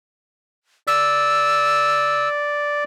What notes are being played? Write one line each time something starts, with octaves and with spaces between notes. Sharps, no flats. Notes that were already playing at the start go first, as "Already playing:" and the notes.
D5 E6